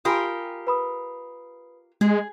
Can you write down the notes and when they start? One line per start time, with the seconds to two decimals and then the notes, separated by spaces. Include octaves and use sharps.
0.05 F4 G4 A#4 G#5 B5 D#6
0.67 B4 B5 D#6
2.01 G#3 G#4